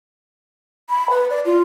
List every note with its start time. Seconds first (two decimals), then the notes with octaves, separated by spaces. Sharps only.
0.90 B5
1.10 B4
1.30 D5
1.45 F4